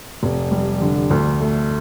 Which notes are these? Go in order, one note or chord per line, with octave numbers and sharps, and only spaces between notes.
F1
G3
D3
D2
A3